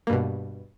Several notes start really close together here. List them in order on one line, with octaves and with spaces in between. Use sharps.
A#3 G2 B2